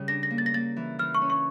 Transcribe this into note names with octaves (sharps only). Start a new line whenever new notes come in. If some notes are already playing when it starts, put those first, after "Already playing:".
Already playing: C#3 G3
D4 A#6
A#6
A#3
A6
A#6
A#3 A6
E3
E3 F6
C#6
C#4
C#6